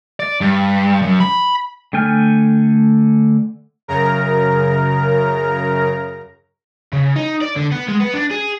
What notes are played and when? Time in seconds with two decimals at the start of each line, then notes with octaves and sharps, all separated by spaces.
0.20 D5
0.41 G2
1.02 F#2
1.20 B5
1.93 D3 A3 G5 G#5 F6
3.88 F#2 C#3 A#4 A#5
6.93 C#3
7.16 D#4
7.42 D5
7.56 D3
7.71 B3
7.88 G#3
8.01 B3
8.14 D4
8.31 G#4